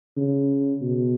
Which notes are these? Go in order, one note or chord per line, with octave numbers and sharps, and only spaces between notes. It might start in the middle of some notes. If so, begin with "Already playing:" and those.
C#3
B2